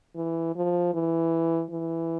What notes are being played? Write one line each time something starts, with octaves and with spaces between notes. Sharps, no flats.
E3
F3
E3
E3